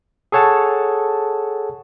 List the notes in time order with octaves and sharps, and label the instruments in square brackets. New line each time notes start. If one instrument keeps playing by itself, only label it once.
[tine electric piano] G#4 A4 C#5 F#5 A5